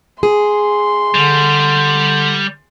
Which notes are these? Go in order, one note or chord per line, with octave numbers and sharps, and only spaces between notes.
G#4 C6
D3 G3